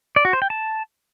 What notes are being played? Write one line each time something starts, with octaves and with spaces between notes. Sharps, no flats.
D5
F#4
C5
G5
A5